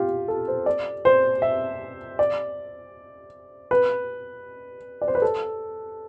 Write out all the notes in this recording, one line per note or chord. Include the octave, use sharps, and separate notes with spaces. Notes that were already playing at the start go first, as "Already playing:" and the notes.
Already playing: F4 G4
A4
C5
D5
C5
E5
D5
B4
D5
C5
B4
A4